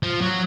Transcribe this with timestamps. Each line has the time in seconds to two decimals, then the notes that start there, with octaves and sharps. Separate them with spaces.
0.03 F3
0.21 F#3